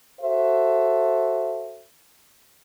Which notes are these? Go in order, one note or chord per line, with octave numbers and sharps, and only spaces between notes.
F#4 A4 C5 E5